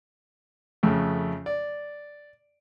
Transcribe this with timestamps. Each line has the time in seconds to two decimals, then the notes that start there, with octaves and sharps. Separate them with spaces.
0.83 F2 C#3 A3
1.46 D5